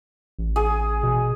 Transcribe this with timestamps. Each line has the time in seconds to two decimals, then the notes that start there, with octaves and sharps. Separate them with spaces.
0.39 A1
0.56 G#4
1.03 B2